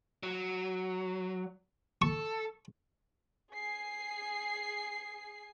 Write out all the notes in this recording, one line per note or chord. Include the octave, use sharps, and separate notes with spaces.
F#3
A4 C#6
G#4 C7